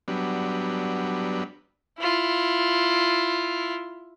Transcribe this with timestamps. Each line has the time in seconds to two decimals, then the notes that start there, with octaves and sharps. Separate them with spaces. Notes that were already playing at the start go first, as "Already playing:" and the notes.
0.08 F#3 G3 B3 D4
2.00 E4 F4